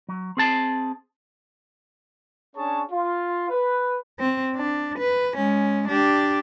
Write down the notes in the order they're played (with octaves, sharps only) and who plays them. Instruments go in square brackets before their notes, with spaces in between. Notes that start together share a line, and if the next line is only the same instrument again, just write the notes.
[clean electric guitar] F#3
C4 G#4 A5
[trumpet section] C#4 D4 G#4 C#5 A5
F4
B4
[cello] C4
D4
B4
G#3 C#4
D4 G4